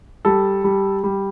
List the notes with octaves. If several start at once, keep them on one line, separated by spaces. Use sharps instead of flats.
G3 A4
G3
G3